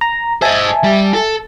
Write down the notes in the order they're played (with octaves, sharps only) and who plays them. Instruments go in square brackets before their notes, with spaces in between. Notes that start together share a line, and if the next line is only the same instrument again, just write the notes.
[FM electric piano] A#5
[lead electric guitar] C5 D#5 [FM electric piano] E5 G#5 A5
[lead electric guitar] G3
A4